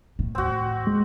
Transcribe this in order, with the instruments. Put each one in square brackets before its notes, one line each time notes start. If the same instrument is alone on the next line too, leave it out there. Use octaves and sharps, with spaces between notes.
[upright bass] A2
[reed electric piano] D#2 [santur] C4 F#4
[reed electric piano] G#3